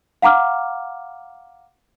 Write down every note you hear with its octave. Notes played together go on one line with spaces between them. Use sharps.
F5 F#5 A#5 D6 F6